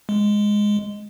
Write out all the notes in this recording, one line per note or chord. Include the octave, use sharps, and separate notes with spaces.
G#3